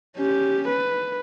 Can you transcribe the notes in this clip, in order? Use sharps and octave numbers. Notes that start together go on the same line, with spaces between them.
C#4 G4
B4